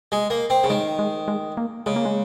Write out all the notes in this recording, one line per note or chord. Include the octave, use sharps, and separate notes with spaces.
G#3
A#3
C4
C#3
D#3 G#3
G#3
G#3
A#3
C#3 G#3
A#3
G#3